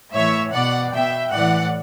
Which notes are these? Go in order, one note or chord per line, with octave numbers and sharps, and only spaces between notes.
A2 E3 C#5 E5
B2 D5 F#5
B2 E5 G5
A2 E3 D5 F#5